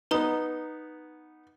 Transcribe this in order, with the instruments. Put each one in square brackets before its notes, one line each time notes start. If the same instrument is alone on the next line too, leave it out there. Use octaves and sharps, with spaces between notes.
[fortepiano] B3 D#4 [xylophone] B4 A#5 D#6